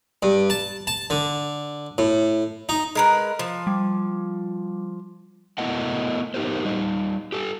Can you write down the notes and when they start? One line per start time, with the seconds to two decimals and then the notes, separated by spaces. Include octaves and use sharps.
0.23 G2
0.50 A5
0.87 A5
1.10 D3
1.98 A2
2.69 D#4
2.95 G#3 A#4 B4
3.39 F3
3.67 G3
5.58 A3 B3 E4 A#4 D#5 F#5
6.34 B3 D#4 G4 A#4 C5
6.65 G3 D#4 D#5
7.32 G4 A4